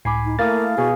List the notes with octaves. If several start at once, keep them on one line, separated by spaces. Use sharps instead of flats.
C#2 A2 G#5 B5 D6 C7
D#4
A3 A#3 E4 F5 D#6 A6
B2 F#4 G#4